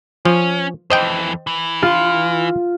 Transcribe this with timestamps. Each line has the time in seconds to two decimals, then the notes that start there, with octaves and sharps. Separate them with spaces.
0.25 F3 C#4
0.90 F2 E3 C5 D#5 G5
1.47 E3
1.82 F4